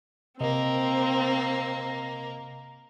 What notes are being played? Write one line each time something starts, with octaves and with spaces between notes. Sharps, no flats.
C3 A#3 C4 D#5